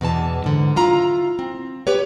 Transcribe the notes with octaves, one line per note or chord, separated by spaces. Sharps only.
E2 B2 E3 A5
G#2 D3
E4 F4 A#5
C4
G4 B4 C#5